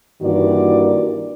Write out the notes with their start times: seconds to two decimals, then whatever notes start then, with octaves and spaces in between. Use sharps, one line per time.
0.22 G2 D#3 E3 A#3 F#4 D5